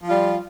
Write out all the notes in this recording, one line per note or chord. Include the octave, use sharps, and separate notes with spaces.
F3 G3 F4